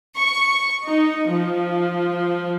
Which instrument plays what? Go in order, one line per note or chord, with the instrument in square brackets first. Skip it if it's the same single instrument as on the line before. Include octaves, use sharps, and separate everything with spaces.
[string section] C#6
D#4
F3